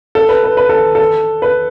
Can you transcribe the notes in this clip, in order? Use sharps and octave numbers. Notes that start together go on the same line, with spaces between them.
A4
B4
B4
B4
A4
A4
B4